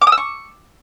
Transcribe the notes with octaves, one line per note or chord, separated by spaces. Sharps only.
D6
D#6
E6
C#6